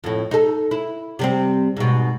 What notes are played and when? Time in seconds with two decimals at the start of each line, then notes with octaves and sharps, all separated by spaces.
0.04 F2 A2
0.31 D#4 A4
0.71 E4
1.19 C3 G3 C4
1.77 G#2 B2